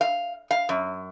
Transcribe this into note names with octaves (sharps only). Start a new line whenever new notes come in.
F5
F5
F#2